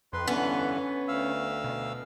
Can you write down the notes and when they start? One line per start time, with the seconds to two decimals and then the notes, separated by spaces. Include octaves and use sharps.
0.13 F2 B4 C6
0.28 G2 D3 E3 B3 C#4
1.08 D2 F5 E6
1.64 B2